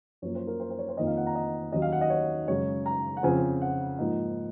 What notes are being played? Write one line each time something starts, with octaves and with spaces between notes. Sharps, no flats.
F#2 F3 A#3 C#5
C5
A#4
C5
C5
C#5
C5
F2 D#3 A#3 D#4 D#5
F5
F#5
A#5
D#5
D#2 D#3 F#3 C#4 D#5
F5
F#5
D#5
C#5
F#2 C#3 G#3 C#5
A#5
F#5
F2 C#3 F3 C4 G#5
F#5
G#2 F3 A#3 D#4